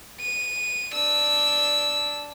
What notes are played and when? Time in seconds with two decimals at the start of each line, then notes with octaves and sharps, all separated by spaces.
0.20 D#7
0.94 D4 E6